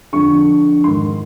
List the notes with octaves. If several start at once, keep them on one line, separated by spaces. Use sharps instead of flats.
F2 D3 C#6
G#2 D#3 C6